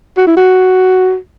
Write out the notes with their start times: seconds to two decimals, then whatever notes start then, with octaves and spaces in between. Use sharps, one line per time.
0.17 F#4
0.27 E4
0.37 F#4